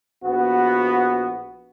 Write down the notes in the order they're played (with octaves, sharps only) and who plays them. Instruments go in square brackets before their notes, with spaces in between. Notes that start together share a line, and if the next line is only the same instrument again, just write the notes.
[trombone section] A#1 B3 F#4